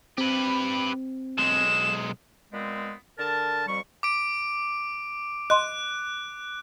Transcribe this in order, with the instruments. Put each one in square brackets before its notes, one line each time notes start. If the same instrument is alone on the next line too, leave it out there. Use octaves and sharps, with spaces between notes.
[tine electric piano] C4 [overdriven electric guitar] G4 B4
[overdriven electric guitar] B1 G#3 [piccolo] E7
[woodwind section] A#2 G#3 B3 C4
D3 A#4 A5
F2 G3 C#6
[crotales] D6 D7
[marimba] D#5 C6 [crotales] F#6